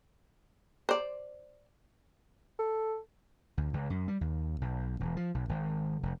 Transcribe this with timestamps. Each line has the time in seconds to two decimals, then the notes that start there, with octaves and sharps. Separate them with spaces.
0.89 C5 D5
2.59 A4
3.57 D2
3.73 C#2
3.90 F#2
4.08 G3
4.21 D#2
4.61 B1
5.00 E1
5.17 F3
5.34 B1
5.49 G#1
6.03 F1